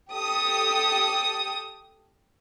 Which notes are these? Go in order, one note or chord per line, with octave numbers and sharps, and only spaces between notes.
G4 A4 D#6